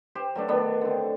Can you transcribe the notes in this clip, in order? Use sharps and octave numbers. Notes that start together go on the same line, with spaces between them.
G4 C5
F#3 A3 D4
D#3 A3 B3 D4
D3 C4